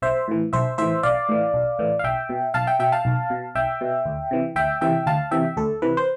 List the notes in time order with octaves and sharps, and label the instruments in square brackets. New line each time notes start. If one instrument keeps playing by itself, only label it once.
[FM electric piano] B1 C5 E5
A2 E3
B1 C5 E5
A2 E3 C5 E5
B1 D5 F5
A2 E3
B1
A2 E3
F5
B1 E5 G5
B2
B1 F5 A5
E5 G5
B2 E5 G5
F5 A5
B1
B2
B1 E5 G5
B2
D2
C3 E3
D2 E5 G5
C3 E3 E5 G5
D2 F5 A5
C3 E3 E5 G5
D2 A4
C3 E3 B4
C5